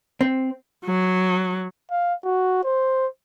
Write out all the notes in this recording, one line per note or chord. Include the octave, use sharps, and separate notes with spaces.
C4
F#3
F5
F#4
C5